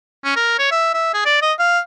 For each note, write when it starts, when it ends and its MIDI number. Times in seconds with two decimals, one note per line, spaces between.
0.24 0.32 61
0.36 0.55 70
0.59 0.67 73
0.71 0.89 76
0.94 1.12 76
1.14 1.24 68
1.25 1.38 74
1.42 1.53 75
1.59 1.79 77